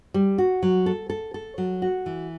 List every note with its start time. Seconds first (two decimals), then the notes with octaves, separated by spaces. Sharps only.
0.14 G3
0.38 F#4
0.63 F#3
0.86 A4
1.10 A4
1.34 A4
1.58 F#3
1.82 F#4
2.06 E3